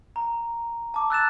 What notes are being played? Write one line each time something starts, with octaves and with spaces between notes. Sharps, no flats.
A#5
A5 D6
E6 F#6 A6 E7